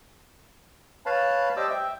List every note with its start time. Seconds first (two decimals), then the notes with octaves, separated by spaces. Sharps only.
1.06 B4 C#5 F5 A5 B5
1.57 G4 C5 D5 D#5 D6 E6
1.70 E5 G5